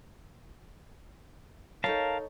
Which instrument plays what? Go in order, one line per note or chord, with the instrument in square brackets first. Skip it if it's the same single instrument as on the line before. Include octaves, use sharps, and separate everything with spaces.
[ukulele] D#4 A4 C#5 [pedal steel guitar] A#4 F5 A5